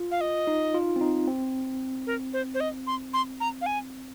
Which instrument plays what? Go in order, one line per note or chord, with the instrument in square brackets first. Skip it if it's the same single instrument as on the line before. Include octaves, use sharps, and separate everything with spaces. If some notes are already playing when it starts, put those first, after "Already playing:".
Already playing: [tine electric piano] F4
[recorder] F5
D#5
[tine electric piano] D#4
F4
C4
D#4
C4
[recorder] A#4
C5
C5
D#5
C6
C6
A#5
F5
G#5